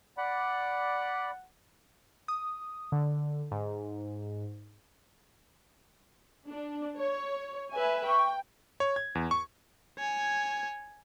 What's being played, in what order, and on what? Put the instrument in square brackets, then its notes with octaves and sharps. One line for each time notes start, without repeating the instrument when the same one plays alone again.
[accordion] D5 B5 [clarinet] F#5
[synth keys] D#6
D3
G#2
[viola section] D4
C#5
B4 E5 G#5
[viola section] G5 [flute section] C#6
[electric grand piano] C#5
G#6
E2
C#6
[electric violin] C#5 G#5